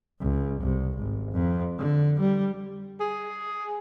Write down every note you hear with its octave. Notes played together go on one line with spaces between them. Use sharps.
C#2
C2
G#1
F2
D3
G3
G#4